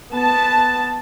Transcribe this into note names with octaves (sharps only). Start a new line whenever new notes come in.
B3 A5